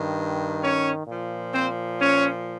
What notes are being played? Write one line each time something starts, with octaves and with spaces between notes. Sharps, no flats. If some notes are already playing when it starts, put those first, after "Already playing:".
Already playing: G2 D#3
C#4 C#5
A#2 F3
C4 C5
C#4 C#5